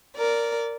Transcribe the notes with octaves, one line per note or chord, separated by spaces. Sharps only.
A#4 D5